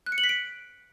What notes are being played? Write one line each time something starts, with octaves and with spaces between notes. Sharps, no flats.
F#6
C#7
F#7
B6
D7